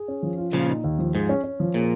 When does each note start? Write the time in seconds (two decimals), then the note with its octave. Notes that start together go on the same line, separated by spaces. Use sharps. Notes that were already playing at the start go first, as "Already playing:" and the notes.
Already playing: G#4
0.08 C#4
0.23 F3
0.38 F4
0.53 A#2 C#3 F3
0.69 D#4
0.84 D#2
0.99 F3
1.14 G#2 G#4
1.29 C#4
1.44 C#4
1.60 F3
1.74 A#2 G#4